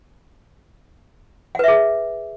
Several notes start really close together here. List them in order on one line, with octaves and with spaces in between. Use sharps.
F#5 B4 E5 G#4